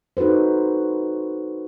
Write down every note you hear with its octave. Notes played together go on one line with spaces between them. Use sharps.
D#4 F#4 A4 B4 C5